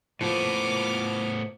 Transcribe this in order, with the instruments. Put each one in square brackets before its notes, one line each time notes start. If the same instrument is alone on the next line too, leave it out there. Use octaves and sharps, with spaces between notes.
[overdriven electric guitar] A2 B3 [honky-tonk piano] F3 [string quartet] A#3 D6 F6 [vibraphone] C5